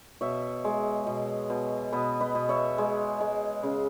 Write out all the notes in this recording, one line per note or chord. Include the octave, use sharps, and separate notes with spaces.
B2 C#5 E5
G#3
B2
B2
B2 B4 D#5
B4 D#5
B2
C#5 E5
G#3
G#3
C#3